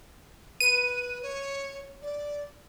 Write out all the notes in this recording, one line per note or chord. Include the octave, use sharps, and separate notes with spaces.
B4 D#7
C#5
D5